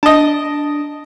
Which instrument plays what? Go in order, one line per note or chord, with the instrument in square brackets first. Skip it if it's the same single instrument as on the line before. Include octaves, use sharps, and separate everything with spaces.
[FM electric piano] D4 [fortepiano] D#5 A5